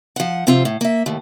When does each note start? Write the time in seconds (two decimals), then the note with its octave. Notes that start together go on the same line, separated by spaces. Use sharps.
0.16 F3 F#5
0.47 C3 F3 C4 F4
0.65 A2
0.81 A#3 E5
1.06 D#2 A2